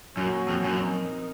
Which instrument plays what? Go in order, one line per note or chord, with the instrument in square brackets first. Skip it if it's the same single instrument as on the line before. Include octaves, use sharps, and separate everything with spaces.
[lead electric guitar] F#2 [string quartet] A#2 F#3 A#3 C#4 F#4
[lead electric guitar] F2
F#2
[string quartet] F3 C4 D#4 A#4